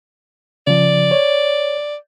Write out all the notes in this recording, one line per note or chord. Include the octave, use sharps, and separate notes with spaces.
C#3 F3 D5
C#5